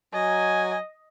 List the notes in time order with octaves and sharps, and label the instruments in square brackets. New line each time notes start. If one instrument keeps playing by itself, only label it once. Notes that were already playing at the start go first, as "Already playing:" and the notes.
[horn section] F#3 G#5 [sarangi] D#5